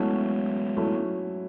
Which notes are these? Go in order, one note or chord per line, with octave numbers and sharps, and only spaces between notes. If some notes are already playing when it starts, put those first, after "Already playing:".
Already playing: F#3 G#3 A3 B3 C#4 E4
F#3 A3 C#4 E4